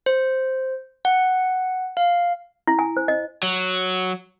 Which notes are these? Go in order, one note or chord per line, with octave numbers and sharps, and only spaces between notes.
C5
F#5
F5
E4
G#5
C5
D#5
F#3